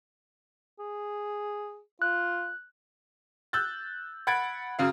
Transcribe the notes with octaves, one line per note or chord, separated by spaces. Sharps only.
G#4
F4 F#6
E6 F#6 G6 A6
F#5 B5 G#6 A6 D7
F#2 C#3 F5